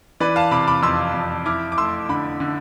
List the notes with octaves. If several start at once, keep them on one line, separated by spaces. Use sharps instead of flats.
E3 B4 D5
F5 A5
C3 B5 D6
B5 D6
F2 C6 E6
F2
E4 D6 F6
D6
A3 C6 E6
D3 B5 D6
D3